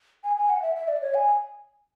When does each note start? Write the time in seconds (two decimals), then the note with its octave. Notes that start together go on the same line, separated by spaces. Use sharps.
0.24 G#5
0.36 G#5
0.49 F#5
0.62 E5
0.76 E5
0.88 D5
1.01 C#5
1.14 G#5